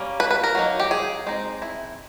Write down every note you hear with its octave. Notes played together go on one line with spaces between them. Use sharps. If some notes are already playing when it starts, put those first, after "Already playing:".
Already playing: G3 A#3 C#4
B4
B4
A#4
F#3 A#3 D#4
G4
G#4
G#3 C4 D#4
E4